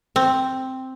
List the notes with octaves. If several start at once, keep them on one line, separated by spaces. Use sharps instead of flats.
C4